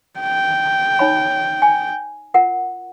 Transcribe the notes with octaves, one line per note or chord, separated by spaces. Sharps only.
G5
D#4 C#5 B5
G#5
F4 A#4 F#5